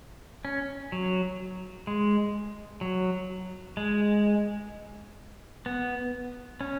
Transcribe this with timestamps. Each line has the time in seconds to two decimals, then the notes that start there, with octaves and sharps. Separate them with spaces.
0.45 C#4
0.92 F#3
1.87 G#3
2.81 F#3
3.77 G#3
5.66 B3
6.61 C#4